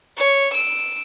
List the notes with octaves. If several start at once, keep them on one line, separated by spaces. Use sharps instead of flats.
C#5
E6 D7